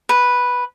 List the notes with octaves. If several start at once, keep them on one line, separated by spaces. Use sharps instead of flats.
B4